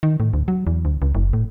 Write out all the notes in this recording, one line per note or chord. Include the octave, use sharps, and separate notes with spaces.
D#3
A2
D2
F#3
E2
D2
C#2
F#1
A2